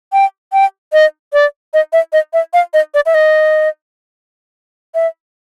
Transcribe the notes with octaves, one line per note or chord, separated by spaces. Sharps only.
G5
G5
D#5
D5
D#5
E5
D#5
E5
F5
D#5
D5
E5
D#5
E5